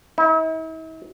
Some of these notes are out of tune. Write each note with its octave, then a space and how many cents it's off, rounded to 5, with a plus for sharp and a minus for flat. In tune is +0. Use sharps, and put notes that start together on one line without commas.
E4 -45